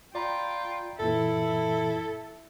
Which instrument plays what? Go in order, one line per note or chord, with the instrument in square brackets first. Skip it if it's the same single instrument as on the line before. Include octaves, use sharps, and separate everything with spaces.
[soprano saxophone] F4 [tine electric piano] D5 A#5 B5 [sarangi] G5
[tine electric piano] F#2 A#2 E3 [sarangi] E4 [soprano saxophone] A4